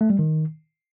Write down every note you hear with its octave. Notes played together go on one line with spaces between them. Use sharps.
A3
G3
D#3